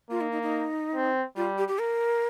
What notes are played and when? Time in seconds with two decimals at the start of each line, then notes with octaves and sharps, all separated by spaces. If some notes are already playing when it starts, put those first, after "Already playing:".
0.10 A#3 F4
0.21 D#4
0.32 D#4
0.42 D#4
0.95 C4
1.36 G3 F4
1.58 G4
1.68 G4
1.79 A#4